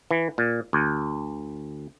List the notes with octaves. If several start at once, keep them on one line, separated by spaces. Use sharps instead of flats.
E3
A#2
D2